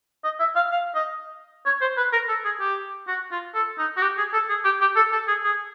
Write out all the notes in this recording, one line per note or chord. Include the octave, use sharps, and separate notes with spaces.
D#5
E5
F5
F5
D#5
C#5
C5
B4
A#4
A4
G#4
G4
F#4
F4
A4
D#4
F#4
G4
G#4
A4
G#4
G4
G4
A4
A4
G#4
G#4